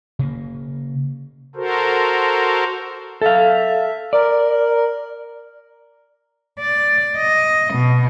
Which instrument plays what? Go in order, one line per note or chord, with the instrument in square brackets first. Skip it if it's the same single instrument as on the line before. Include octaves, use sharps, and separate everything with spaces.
[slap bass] C#3 A#3
[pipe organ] F#4 A4 A#4 C5
[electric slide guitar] A4 F5 [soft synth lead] E5
[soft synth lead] A#4 [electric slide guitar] D5
[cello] D5
D#5
B2